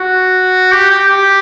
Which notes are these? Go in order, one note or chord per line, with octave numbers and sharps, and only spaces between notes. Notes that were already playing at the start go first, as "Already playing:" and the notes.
Already playing: F#4
G4
G4
G4